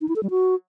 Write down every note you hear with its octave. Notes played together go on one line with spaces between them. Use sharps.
D#4
E4
A4
G3
F#4